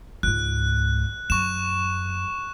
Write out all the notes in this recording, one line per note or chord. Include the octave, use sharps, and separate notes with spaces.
C#2 G#2 F#6
F#2 C#6 E7